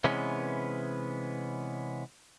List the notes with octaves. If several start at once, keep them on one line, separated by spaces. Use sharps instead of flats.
C3 E3 G#3 B3 C#4